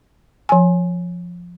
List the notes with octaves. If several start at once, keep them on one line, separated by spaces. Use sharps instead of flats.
F3 G#5